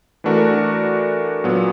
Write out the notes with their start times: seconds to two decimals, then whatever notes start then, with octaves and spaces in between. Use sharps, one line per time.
0.24 E3 A3 D4 F#4 A#4
1.44 A#2 F#3 B3